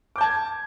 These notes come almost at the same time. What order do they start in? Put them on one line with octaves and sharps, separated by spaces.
D6 G6 A5 G#6